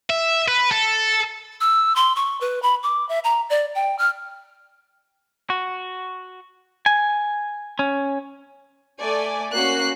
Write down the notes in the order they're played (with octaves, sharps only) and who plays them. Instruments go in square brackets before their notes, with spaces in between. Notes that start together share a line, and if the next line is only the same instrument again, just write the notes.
[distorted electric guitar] E5
B4
A4
[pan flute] E6
C6
C#6
B4
B5
D6
E5
A#5
D5
G5
F6
[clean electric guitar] F#4
G#5
C#4
[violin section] A3 D5 G#5
A#3 C#4 F#4 F#6 C7